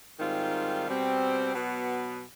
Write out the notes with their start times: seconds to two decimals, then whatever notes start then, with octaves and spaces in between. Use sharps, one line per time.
0.19 G#2 D#3 G3 C4 F4
0.86 B2 G3 C4
1.55 B2 F#3 B3